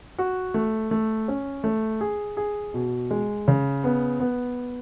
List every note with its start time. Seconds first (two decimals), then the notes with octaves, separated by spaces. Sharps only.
0.18 F#4
0.54 A3
0.91 A3
1.28 C#4
1.64 A3
2.01 G#4
2.37 G#4
2.74 B2
3.11 G#3
3.48 C#3
3.84 B3
4.20 B3